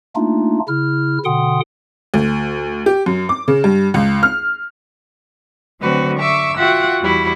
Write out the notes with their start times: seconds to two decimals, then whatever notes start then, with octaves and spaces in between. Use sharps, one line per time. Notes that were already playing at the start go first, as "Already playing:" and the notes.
0.16 A3 A#3 D4 D#4 F4
0.68 C#3 E4 F6
1.25 B2 D3 F#5 G5 C6 D#6
2.14 D2
2.86 G4
3.06 F#2
3.29 D6
3.48 C#3
3.64 G2
3.94 C#2
4.23 F6
5.80 D3 F#3 A3 C4 F#4 B4
6.18 E5 C#6 D6 E6
6.56 F4 F#4 E5 F#5 G5
7.01 E2 G3 E4 F#4